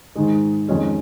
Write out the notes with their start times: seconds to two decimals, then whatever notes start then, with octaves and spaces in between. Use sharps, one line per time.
0.16 G#2 D#3 G#3
0.68 F2 D#3 G#3 C#4